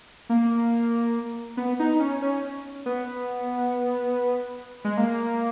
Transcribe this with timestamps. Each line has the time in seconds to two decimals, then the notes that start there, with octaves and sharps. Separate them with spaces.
0.29 A#3
1.57 B3
1.79 D#4
2.00 C#4
2.22 C#4
2.86 B3
4.85 G#3
4.97 A#3